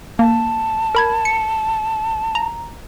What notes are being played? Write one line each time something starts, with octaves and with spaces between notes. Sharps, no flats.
A#3 A5
A#4 B5 G#6
C#7
A#5